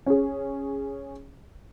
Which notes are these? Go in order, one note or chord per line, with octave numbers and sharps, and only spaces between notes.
C#4 G#4